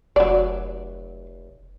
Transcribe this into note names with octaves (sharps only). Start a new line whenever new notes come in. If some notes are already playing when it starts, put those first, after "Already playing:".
F1 F#3 D5